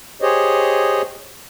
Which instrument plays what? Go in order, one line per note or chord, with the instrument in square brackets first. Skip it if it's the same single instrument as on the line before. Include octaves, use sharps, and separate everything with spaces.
[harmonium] G4 G#4 C5 C#5 D#5